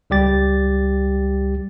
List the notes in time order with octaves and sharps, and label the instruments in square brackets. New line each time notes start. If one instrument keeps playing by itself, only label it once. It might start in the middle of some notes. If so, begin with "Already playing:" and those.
[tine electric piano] C#2 G3 G4 A6